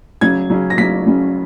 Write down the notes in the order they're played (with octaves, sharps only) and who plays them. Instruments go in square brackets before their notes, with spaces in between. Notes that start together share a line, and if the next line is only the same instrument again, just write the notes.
[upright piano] C#3 F#3 C#4 G#6
C#3 F#3 C#4
A#6
C#3 F#3 C#4 B6
C#3 F#3 C#4